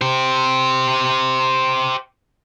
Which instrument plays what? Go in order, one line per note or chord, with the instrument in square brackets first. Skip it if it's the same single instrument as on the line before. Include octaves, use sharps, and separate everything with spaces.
[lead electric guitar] G4 C5